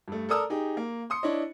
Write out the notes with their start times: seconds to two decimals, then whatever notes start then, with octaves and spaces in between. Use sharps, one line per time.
0.08 G2 A3
0.29 A4 A#4 D5 D#6 E6
0.50 D#4 G4 G#4
0.77 A#3
1.10 C6 D#6 C#7
1.23 D4 E4 C#5 D#5